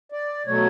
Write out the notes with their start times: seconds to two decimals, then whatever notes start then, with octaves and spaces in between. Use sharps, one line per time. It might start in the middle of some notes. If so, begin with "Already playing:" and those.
0.12 D5
0.47 B2 F#3 A3 C#5